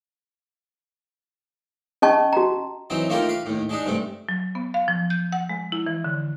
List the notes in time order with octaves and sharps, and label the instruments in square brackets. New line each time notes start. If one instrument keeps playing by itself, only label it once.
[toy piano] C#4 D#5 A5 C#6
F#4 A#5
[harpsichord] E3 F#3 C4 D#4
A3 A#3 D#4 F4 G4 A#4
B4 F5
D#2 A2
G#3 D4 D#4
G2 C3 A3
[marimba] F#3
B3
F5
F3
G6
F#5
G#3
E4
E3
D3